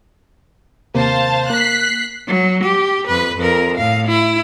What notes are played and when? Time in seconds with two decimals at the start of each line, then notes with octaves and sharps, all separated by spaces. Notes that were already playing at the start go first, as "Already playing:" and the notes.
0.95 D#2 C3 A#3 C5 F5 A5
1.50 A#3 F#6 B6 C7
2.27 F#3
2.64 G4
3.07 F2 B4
3.37 F2 A#4
3.77 A2 F5
4.07 E4